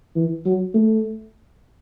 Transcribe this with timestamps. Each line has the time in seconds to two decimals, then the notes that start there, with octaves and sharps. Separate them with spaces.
0.16 E3
0.46 F#3
0.74 A3